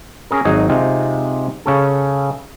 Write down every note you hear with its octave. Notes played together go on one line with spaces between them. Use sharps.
C#4 G#4 A#4
G#1 F#3 D#4 G#4 G#5
C3 G#3 D#4 F4
C#3 C#4 A4